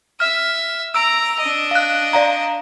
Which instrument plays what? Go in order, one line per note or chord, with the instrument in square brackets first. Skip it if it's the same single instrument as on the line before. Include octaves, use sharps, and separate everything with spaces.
[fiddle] E5 [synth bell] F6
[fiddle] A#5 [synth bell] E6 D7
[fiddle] D4 D#5
[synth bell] F5 F#6
D5 F5 A#5